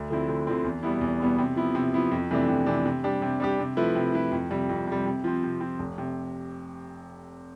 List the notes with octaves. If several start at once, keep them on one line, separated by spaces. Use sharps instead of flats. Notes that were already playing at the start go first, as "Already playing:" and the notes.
Already playing: D2
D3 F3 C4 E4
D2
D3 F3 C4 E4
E2
B2 G3 B3 E4
E2
B2 G3 B3 E4
C3
F3 B3 E4
C3
F3 B3 E4
F2
C3 E3 A3 D4
F2
C3 E3 A3 D4
C3
G3 D4 G4
C3
G3 D4 G4
C3
F3 A3 E4 B4
C3
F3 A3 E4 B4
F2
C3 G3
F2
C3 G3
C3
F3 C4
C3
F3 C4
F1
C3